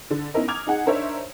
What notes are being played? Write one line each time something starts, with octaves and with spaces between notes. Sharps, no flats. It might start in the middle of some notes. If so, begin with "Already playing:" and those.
D3
B3 C#4 D#4 E4 A#4 D#5
A#5 D6 D#6 F6 G#6 F7
D#4 G#4 F#5
D4 D#4 A#4 C5 C#5 E5